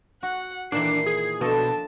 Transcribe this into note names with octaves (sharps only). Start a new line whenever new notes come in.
F#4 F#5
A#2 D#3 E3 D4 C7
G#4
B2 F3 D4 A4 D#5 A5